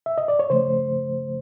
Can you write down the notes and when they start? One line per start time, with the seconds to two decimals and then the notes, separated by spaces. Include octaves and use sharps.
0.06 E5
0.18 D#5
0.28 D5
0.39 C#5
0.50 C#3 F3 A3 C5